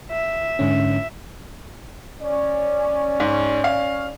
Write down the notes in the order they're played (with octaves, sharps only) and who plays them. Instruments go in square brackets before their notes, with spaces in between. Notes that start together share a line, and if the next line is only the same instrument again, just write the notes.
[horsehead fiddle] E5
[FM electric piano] G#2 D3 C#4
[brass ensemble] C#4 D5
[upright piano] G#2
F5